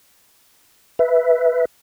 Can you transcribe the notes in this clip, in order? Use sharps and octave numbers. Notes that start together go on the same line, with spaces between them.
B4 E5